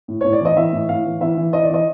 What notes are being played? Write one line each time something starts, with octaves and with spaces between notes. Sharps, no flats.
A2
A2 C#5
D5
E3 D#5
E3 E5
A2
A2 F5
E3
E3 E5
E3
E3 D#5
D5
E3 D#5